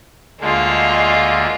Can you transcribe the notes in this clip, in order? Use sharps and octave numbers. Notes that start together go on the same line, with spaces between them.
D2 D3 G#3 A#3 F4